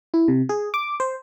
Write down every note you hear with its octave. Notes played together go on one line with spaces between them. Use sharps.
E4
C3
G#4
D6
C5